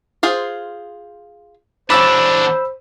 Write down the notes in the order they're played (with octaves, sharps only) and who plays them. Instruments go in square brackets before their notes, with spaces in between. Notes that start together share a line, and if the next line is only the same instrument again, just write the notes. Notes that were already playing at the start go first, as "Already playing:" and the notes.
[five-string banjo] F4 G#4 C5
[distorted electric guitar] E2 D4 [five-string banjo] C#4 D5 [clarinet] C5 [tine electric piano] B5 E6